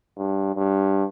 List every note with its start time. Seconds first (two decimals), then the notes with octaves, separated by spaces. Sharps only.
0.18 G2
0.56 G2